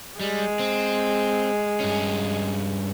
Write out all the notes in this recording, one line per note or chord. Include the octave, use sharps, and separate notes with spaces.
G3 G#3
C4
G2 C#4